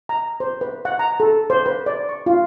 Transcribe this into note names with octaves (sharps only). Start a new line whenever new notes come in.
A#5
C5
B4
F#5
A#5
A4
C5
B4
D5
C#6
F4